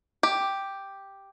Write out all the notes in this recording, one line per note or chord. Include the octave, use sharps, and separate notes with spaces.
G4